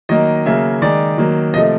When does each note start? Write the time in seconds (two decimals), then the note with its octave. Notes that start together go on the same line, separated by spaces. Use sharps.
0.09 D#3 F#3 A#3 D#5
0.46 C#3 F#3 A#3 E5
0.82 D#3 G#3 D5
1.18 D#3 F#3 A#3
1.54 C3 F3 A3 D#5